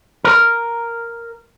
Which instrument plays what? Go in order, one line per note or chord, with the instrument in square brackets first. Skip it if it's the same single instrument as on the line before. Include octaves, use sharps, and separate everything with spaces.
[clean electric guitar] A#4